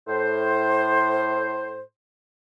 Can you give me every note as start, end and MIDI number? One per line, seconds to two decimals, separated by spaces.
0.08 1.80 45
0.08 1.80 72